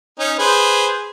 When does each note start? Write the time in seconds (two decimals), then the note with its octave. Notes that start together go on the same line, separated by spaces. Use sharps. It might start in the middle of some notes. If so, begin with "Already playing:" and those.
0.19 C#4 D#4
0.39 G#4 B4 C5